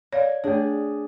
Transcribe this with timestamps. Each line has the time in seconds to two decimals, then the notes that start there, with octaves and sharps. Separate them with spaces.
0.13 C#5 D5 F5 G#6
0.44 A3 D4 G#4 C#5